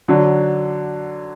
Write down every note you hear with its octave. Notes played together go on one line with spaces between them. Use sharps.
D3 F#3 D4